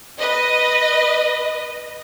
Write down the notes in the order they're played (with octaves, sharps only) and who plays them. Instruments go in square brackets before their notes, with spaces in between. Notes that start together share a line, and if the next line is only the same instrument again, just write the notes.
[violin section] B4 D#5